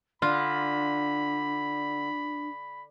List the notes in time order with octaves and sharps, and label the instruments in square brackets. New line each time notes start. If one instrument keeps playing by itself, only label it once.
[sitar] D3 [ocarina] D4 [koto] F4 [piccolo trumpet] B5